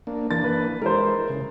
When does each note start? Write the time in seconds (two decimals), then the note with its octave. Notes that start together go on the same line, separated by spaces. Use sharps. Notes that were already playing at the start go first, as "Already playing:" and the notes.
0.07 A#3 D4
0.31 E3 A#3 D4 A6
0.44 B4
0.82 G#3 E4 A#4 C5
1.29 C#3